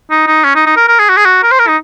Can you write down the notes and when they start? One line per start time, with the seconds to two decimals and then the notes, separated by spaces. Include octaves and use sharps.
0.11 D#4
0.27 D#4
0.44 C#4
0.55 D#4
0.66 D#4
0.76 A#4
0.88 A#4
0.99 G#4
1.09 F#4
1.17 G#4
1.25 F#4
1.43 A#4
1.51 C5
1.59 A#4
1.68 D#4